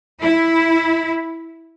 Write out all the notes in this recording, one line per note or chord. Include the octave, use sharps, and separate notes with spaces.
E4